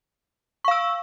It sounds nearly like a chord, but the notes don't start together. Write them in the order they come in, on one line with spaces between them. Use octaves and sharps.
C#6 F5 E6